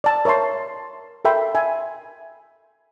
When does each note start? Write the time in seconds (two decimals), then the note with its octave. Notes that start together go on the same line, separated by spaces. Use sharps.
0.04 D5 A5
0.25 A#4 C#5 E5 A5 C6
1.25 A4 A#4 E5 G5 B5 C6
1.55 E5 G#5